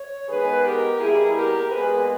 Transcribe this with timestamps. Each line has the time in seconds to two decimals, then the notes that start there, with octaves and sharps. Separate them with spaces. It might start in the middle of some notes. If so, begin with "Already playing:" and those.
Already playing: C#5
0.29 D#3 G#3 B3 G#4 B4
0.64 G4 A#4
1.00 B2 G3 A#3 E4 G#4
1.35 G4 A#4
1.71 A#2 G#3 B3 G#4 B4